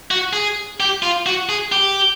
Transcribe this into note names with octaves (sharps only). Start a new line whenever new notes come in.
F#4
G#4
G4
F4
F#4
G#4
G4